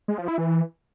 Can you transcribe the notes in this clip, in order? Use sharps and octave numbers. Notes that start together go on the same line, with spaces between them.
G#3
F3
E4
E3